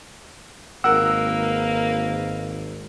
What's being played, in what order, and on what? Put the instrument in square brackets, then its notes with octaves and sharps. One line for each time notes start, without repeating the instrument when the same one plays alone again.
[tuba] G#1 [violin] A#3 B4 [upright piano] A#4 F#5 [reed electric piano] E6